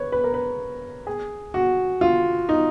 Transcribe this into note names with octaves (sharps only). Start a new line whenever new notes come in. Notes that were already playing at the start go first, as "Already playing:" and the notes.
Already playing: B4 C#5
B4
A#4
B4
G#4
F#4
F4
D#4